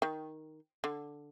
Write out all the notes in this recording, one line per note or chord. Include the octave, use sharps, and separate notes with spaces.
D#3
D3